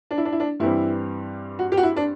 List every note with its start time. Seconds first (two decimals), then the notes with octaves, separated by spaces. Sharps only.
0.11 D4
0.17 E4
0.25 D4
0.32 E4
0.40 D4
0.60 G2 E3 G3 C4 E4
1.59 F#4
1.72 G4
1.77 F#4
1.83 E4
1.96 D4